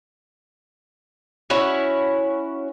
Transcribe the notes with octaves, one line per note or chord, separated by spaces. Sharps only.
C#4 E4 F#4 C#5